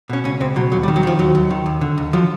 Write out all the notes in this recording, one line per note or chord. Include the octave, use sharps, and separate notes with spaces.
B2 C#4
C#2 C#4
C#2 C4
B2 F#3
D#2 F#3
G3
D#3
F#3
D#3 F3
D#2 F#3
D#2
D#3
D#2
D3
D#2
F3 F#3